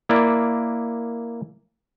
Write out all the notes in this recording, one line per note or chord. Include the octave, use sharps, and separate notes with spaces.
A#3 E4 D5